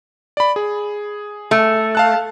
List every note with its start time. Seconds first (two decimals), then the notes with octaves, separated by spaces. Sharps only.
0.37 D5 B5
0.56 G#4
1.51 A3
1.95 F5 A5 F#6